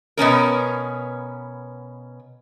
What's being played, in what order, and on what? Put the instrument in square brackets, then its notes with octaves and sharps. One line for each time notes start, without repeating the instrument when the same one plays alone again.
[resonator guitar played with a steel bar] B2 B3 C#4 A#4